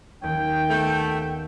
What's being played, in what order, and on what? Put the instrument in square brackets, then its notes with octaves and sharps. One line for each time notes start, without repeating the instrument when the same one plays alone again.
[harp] D#2 C#4 [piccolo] G5
[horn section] A3 [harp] B3